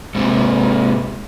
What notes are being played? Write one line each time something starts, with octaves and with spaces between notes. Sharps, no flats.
G#2 C3